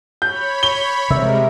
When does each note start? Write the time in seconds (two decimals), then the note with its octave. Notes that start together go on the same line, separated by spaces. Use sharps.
0.22 C#5 B5 G6
0.63 G7
1.10 C3 G3 G#3 A#4 E5